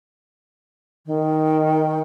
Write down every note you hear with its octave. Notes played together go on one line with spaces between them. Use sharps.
D#3